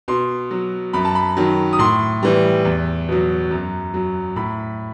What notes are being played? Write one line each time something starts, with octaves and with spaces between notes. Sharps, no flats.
B2 C6
F#3
F#2 B5
A5
B5
D#3 F#3
D#6
A2 C6
E3 G3
E2
B2 F#3
F#2
F#3
A2 B5